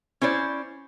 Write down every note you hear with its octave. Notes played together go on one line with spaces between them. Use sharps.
C#4 E4 C5 D5